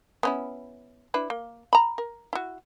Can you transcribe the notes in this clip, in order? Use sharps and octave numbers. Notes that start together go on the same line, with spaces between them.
B3 C#4 E4
D4 E4 B4
A#3
A#5 B5
A#4
E4 F#4